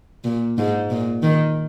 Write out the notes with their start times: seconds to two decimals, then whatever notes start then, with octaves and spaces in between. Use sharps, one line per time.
0.25 A#2
0.58 G#2
0.90 A#2
1.23 D#3